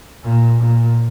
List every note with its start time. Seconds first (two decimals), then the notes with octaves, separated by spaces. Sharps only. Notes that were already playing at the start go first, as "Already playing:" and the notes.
0.23 A#2
0.60 A#2